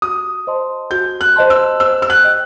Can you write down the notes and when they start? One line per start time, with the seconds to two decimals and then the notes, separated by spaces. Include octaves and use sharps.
0.02 F#4 D#6
0.47 C5 D#5 A5 C6
0.91 F#4 G6
1.21 F#6
1.36 C5 D#5 A5 C6
1.50 E6
1.80 C5 E6
2.02 E6
2.10 F#6
2.24 D#5 G5